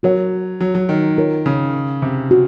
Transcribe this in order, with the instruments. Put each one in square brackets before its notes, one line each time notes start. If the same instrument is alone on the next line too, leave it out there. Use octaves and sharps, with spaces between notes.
[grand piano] F#3 [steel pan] F#4 A#4 C#5 F#5
[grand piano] F#3
F#3
D#3
[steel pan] F4 A#4 C#5
[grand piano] C#3
C3
[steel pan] F#4